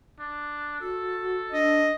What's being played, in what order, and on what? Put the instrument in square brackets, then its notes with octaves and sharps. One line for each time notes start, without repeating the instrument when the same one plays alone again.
[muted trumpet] D4
[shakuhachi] F#4 [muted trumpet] A4
[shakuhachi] D4 [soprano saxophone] D#5